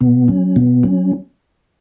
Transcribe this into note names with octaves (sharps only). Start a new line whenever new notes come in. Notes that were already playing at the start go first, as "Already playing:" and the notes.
B2 B3
F#3 C#4
B2 B3
F#3 C#4